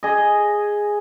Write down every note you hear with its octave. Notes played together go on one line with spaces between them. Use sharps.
G#4 D#5